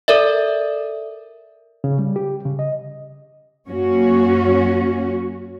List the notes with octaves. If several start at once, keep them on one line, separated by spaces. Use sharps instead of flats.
A4 A#4 D5 E5
C#3
G3
G4
C#3
D#5
F#2 A#3 C#4 F#4 C#5